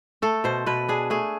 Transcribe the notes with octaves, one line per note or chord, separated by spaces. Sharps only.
A3 A4
B2 C5
B2 B4
D4 G#4
A3 G#4